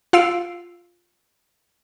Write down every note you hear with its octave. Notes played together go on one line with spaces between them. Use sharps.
F4 F5 E6 C7 D7